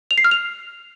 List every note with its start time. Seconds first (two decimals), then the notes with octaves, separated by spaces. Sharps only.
0.11 F7
0.18 C7
0.24 F6
0.31 F7